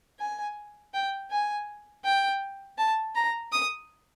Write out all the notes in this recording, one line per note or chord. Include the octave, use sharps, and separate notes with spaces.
G#5
G5
G#5
G5
A5
A#5
D#6